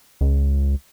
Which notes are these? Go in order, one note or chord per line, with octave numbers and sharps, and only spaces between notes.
C#2